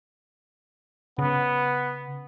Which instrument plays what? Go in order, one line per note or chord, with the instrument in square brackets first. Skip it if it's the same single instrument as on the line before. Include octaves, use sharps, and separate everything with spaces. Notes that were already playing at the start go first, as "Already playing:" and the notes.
[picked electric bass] C#3 [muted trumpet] B3